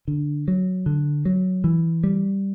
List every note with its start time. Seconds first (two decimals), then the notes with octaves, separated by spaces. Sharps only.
0.08 D3
0.48 F#3
0.86 D3
1.25 F#3
1.64 E3
2.04 G3